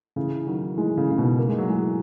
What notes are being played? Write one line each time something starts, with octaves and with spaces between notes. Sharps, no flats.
C#3 E3
D#3 F#3
E3 G#3
C#3
C#3
B2 D#3
A#3
G#3
F#3
E3 G#3